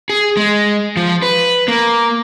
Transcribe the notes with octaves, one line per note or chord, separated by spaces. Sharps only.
G#4
G#3
F3
B4
A#3